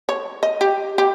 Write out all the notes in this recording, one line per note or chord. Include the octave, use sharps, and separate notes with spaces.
C#5
D#5
G4
G4